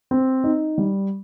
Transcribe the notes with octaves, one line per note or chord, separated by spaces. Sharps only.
C4
D#4
G3